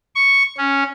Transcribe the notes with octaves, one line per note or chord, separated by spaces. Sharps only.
C#6
C#4